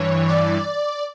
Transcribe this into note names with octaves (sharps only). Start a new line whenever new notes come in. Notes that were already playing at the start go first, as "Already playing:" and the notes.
Already playing: G2 E3 C#5
D5